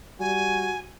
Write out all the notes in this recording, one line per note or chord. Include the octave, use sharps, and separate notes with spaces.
G3 F#4 G#5